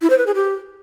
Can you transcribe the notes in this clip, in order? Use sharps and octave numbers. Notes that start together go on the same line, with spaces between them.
E4
C5
B4
G#4
G4